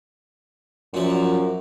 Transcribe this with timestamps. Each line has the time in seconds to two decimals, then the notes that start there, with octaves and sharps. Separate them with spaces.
0.94 F#2 A#2 F3